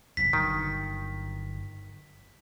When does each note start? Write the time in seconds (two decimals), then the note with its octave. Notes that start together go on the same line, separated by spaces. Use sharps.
0.17 F1 B1 E2 B6
0.33 G1 G2 D#3 F#3